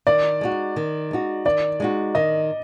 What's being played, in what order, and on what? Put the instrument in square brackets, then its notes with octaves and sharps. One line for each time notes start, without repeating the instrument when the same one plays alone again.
[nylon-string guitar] D#3 [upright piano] D5
[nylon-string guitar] G#3 D#4 F#4
D#3
G#3 D#4 F#4
[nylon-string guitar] D#3 [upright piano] D5
[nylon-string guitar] G#3 D#4 F#4
[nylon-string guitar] D#3 [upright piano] D#5